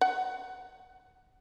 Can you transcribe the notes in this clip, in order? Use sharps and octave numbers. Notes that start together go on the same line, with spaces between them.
F#5